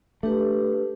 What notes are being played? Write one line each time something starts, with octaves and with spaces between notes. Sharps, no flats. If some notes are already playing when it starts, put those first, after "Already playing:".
A3 D4 G4 B4